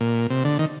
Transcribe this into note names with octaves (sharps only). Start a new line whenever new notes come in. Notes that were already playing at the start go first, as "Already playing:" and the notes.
A#2
C3
D3
D#3